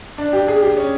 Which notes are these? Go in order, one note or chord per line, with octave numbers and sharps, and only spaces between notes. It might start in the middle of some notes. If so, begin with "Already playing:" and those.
D4
G4
G#4
G4
C#4